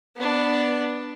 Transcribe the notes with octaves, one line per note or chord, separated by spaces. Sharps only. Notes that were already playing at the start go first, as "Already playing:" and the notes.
B3 D4